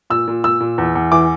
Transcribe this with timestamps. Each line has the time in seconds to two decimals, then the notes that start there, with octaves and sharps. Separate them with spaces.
0.10 A#2 E6
0.28 A#2
0.44 A#2 E6
0.60 A#2
0.78 E2
0.95 E2
1.12 E3 D6